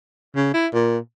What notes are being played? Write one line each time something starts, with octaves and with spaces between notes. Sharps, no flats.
C#3
E4
A#2